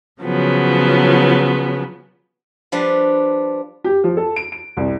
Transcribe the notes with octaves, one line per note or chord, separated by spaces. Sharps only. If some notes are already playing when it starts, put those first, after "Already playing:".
C#3 F3 F#3 B3
F3 G3 D4 B4
G4
F3
A4
D7
D7
C2